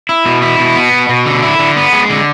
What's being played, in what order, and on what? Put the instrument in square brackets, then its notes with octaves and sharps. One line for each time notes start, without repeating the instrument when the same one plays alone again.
[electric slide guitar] E4
B2
E4
B2
B3
B2
B2
D3
E4
D3
B3
G#3
D3